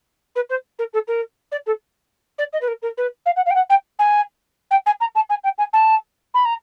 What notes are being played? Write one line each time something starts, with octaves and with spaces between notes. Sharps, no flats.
B4
C5
A#4
A4
A#4
D5
A4
D5
D#5
B4
A#4
A#4
B4
F5
F#5
F5
G5
F#5
G5
G#5
G5
G#5
A#5
A5
G#5
G5
G#5
A5
B5
A#5